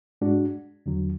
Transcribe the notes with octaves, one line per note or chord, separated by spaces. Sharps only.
G#2 G#3 D4 F#4
E2 D3 F#3